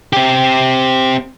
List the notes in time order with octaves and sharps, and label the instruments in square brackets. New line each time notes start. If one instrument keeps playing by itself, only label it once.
[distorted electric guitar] C4 G4